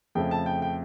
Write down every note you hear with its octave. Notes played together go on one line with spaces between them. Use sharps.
F2 C#3 F3 A3 G5
A5
G5
G5